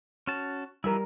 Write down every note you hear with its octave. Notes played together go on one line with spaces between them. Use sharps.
C#4 F#4 A5
E3 F3 G3 E4 A#4